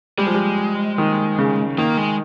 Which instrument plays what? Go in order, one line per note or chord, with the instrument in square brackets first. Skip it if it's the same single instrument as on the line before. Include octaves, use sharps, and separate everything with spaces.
[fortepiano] G3 [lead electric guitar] G#3
[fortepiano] F3
G3
D#3
C#3
[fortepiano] D#3 [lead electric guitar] A#3
[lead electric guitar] G#3